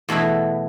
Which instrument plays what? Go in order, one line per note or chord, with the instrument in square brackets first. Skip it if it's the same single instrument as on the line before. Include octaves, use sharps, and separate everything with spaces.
[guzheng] E2 B2 A3 E4